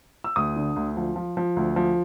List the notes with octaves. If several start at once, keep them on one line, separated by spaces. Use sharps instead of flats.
E6
D2 D#6
D3
D2
F3
F3
F3
D2
F3